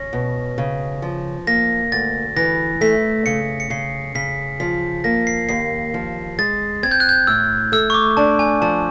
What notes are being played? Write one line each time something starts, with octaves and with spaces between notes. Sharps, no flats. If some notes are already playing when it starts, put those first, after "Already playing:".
Already playing: C#4 A#6
B2
C#3
F3
A#3 A#6
D2 A6
E3 A#6
A3 B6
C#3 C#7
C#7
C#3 C7
C#3 B6
F3 B6
A#3 A#6
C7
D#2 C7
F3
G#3 A6
C4 G#6
G6
F#6
G6
A2 E6
A3 E6
C#6
D6
D4 A5
G#5
F3 A5